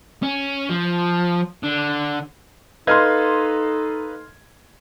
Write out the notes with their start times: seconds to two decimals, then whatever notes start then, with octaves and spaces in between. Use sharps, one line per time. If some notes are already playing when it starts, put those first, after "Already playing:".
0.23 C#4
0.69 F3
1.63 D3
2.87 D#4 A4 B4 D#5 F5 C6 F6 G#6